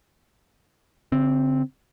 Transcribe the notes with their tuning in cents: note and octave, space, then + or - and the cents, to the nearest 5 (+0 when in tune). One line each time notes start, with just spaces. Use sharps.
D3 -45 C4 +0